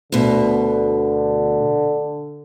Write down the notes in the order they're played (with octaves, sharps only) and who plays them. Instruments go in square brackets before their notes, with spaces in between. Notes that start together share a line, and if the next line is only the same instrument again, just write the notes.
[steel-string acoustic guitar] D2 B2 [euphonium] D3